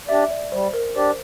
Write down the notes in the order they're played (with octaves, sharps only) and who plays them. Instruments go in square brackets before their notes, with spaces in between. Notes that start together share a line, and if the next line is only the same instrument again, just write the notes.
[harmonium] D4 G4 D5 [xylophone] E5
[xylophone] D5
[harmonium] G3 [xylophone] C5
[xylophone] A#4
[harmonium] D4 G4 D5 [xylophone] C5